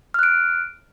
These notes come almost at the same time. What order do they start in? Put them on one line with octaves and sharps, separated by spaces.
F6 F#6 D7